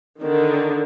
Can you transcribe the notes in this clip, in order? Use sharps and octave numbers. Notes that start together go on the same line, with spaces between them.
D3 D#3